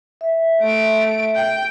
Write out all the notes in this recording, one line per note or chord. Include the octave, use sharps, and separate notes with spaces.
E5
A3 D7
G5